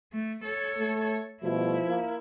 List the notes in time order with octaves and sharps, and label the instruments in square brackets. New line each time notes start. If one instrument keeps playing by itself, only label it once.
[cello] A3
A4 C#5
[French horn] A3
[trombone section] B2 G3 A3 [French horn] F3 [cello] E4
[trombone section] A#3